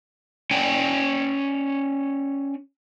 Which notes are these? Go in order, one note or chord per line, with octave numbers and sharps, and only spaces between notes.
C#4 D5 G5 G#5